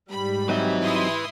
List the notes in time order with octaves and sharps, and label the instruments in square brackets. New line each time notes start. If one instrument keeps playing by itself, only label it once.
[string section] G#2 G3 [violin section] B5
[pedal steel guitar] F#3 C4 D#4 [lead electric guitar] B4 E5
[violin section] E4 C6 D#6